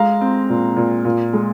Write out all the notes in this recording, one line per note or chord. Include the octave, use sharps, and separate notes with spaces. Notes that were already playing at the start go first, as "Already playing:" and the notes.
Already playing: G#3 F5 A#5
C4
A#2
A#2
A#2
G#3